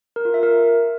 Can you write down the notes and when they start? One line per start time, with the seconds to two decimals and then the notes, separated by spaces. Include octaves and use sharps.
0.16 A#4
0.25 F4
0.34 E5
0.43 A#4